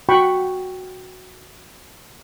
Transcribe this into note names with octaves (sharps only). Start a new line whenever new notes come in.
F#4 F#5 G5 B5 C#6